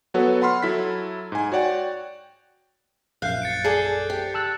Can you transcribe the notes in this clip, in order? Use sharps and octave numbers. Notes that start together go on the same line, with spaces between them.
F#3 B3 F#4 A4 B4 C#5
F#5 B5 C6 F6
F#3 E4 A4 B6
G#2 G#5
F#4 C#5 D5 F#5 G5
A#1 F#2 F5 F#6 G6 C7
A6 C#7 D7
G#4 A4 D5
G4
A5 E6 F#6